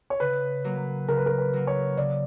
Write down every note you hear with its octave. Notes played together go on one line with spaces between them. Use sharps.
C#5
C#3 B4
F#3 A#3
C#3 A#4
B4
A#4
B4
F#3 A#3
C#5
C#3 D5